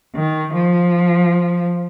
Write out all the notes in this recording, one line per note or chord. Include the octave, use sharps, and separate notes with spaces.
D#3
F3